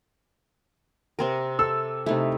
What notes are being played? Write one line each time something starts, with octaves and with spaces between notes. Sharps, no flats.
C3 C4 A#4
A4 E6
C3 A3 D#4 E4